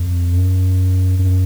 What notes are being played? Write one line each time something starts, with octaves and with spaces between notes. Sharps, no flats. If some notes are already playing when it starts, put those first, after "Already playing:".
Already playing: F2
F#2
F#2